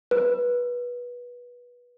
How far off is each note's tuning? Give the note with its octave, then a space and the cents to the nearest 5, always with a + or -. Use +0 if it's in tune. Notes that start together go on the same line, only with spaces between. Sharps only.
B4 -20